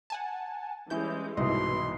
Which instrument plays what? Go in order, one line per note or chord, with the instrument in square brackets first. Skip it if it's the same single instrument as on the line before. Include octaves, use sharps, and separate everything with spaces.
[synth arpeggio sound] F#5 G#5 A5
[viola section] E3 G3 G#3 [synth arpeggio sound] C#4 E4 G6
[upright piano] C2 G#2 B2 [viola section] E3 F#3 B3 [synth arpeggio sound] D#5 [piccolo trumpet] C6